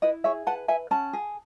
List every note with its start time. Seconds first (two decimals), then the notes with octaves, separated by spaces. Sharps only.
0.02 E4 B4 D#5
0.24 G#4 C#5 E5
0.47 B4 F#5 A5
0.68 B4 E5 G#5
0.91 C#4 F#5 A5
1.13 G#4